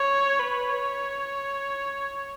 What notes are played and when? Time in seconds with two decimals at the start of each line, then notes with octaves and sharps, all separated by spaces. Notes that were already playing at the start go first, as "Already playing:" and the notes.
Already playing: C#5
0.39 B4
0.69 C#5